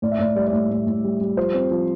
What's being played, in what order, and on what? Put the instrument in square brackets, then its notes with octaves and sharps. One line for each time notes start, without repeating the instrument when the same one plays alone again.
[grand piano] A2 D5
E5
A2 D5
G3 D5
D5
A2
A2
A2
G3
G3
F3 C5
C4
F3